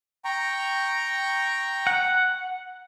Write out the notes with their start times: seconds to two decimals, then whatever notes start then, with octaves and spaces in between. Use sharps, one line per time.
0.25 G5 A#5 C#6
1.87 F#5